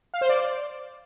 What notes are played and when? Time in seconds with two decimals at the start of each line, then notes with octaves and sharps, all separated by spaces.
0.14 F5
0.21 C5
0.29 D5